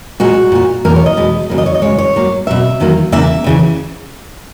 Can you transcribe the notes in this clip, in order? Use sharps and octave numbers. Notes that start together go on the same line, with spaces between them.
A#2 G#3 F#4
A#2 A#3
E2 B2 A#3 A#4
C#5
D#5
E2 B2 G#3
D#2 C#3 F#3 A#3
D#5
C#5
D#5
F#2 C#3 G#3 C#5
C#5
G#2 F#3 A#3
B2 F#3 A#3 E5
E2 D#3 F#3 A#3
E2 C#3 E3 A#3 E5
D#2 C#3 E3